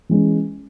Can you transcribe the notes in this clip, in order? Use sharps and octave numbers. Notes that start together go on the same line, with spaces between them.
E3 G#3 C#4